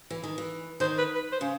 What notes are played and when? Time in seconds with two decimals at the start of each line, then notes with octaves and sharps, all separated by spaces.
0.10 E3
0.24 D#3
0.38 E3
0.80 D#3 C5
0.98 B4
1.15 B4
1.32 C5
1.41 C#3